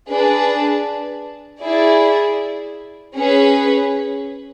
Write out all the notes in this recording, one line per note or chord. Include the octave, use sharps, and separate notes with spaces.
D4 G#4 B4
E4 G#4 D5
C#4 G#4 B4